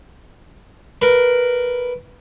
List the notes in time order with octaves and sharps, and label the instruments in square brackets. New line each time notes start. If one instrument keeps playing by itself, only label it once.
[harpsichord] A#4 B4